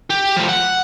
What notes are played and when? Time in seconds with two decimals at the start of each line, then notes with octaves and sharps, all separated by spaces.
0.11 G4
0.37 A2 F3
0.49 F#5